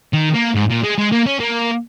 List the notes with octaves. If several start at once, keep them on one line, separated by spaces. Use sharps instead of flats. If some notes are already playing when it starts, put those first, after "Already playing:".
D#3
A#3
G#2
A#2
G#3
G#3
A#3
C#4
A#3